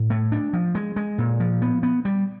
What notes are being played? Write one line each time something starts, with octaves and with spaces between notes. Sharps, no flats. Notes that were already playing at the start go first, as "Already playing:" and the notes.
Already playing: A2
A3
D4
F3
G#3
G#3
A#2
F3
B3
B3
G3